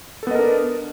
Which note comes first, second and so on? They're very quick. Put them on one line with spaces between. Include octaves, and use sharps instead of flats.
A4 B3 D#5 A#4 D4